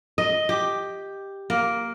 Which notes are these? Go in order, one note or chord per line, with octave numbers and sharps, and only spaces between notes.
D#5
G4
A#3